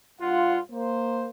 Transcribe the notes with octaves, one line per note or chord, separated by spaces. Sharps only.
G2 F4 F#5
A#3 C5